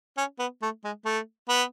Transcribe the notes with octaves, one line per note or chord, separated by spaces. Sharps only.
C#4
B3
A3
G#3
A3
B3